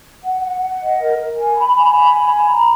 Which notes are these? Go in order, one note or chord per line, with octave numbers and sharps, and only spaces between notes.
F#5
F#5
F#5
D#5
A#4
A#4
G#5
B5
G#5
B5
G#5
B5
A#5